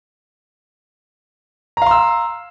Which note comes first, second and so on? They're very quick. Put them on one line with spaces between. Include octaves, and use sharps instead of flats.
A#5 F5 C6 E6